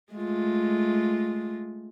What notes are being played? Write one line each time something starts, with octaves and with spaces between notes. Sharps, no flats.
G#3 A3 F4